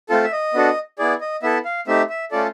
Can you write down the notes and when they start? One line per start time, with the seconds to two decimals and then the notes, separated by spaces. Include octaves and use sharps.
0.09 A3 C4 F4 A4
0.24 E5
0.32 D#5
0.54 B3 D4 F#4 A4
0.98 B3 E4 G#4 D5
1.21 D#5
1.42 B3 E4 A4 E5
1.65 F5
1.87 A3 C4 D#4 G4 E5
2.10 E5
2.31 A3 C#4 F4 A4 D5